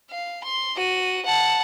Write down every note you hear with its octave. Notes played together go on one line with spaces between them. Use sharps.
F5
C6
F#4 D#7
F#5 A5